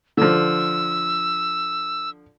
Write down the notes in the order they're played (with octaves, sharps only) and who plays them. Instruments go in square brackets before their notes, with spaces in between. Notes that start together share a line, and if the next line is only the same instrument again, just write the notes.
[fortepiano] D3 F3 [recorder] E6